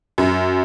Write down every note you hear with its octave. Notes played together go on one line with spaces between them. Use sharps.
F#2